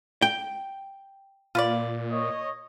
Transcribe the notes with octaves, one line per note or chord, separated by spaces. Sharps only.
G5
A#2 F4 B4 D5
C#5 D#5